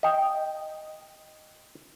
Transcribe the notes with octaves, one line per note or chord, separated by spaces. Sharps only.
D#5 G5